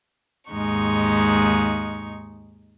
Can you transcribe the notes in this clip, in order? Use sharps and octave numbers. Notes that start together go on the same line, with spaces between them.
D#2 G#2 G#3 D#4 C#6